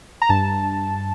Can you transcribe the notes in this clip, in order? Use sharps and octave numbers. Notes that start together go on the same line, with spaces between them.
A#5
G2 A5